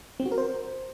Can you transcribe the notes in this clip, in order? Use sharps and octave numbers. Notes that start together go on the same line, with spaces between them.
C4
F#4
A#4
C5